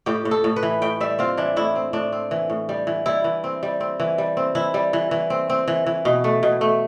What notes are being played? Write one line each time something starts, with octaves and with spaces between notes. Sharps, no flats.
A2 G4
A2
A4
A2
B4
E3
A2 G5
G3 E5
C4 F4
E3 D4
A2 E4
C4
A2 D4
C4
E3
A2
G3
E3
G3 E4
E3
C4
G3
C4
E3
G3
C4
E3 E4
G3
E3
E3
C4
C4
E3
E3
B2
A3
B2
A3